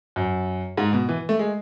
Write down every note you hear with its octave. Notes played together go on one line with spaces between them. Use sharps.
F#2
G#2
B2
E3
A3
G#3